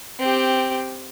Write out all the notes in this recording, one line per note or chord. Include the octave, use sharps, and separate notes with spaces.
C4 G4